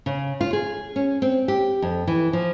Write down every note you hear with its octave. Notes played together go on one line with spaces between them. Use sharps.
C#3
F4
G#4
C#4
C4
G4
F2
E3
F3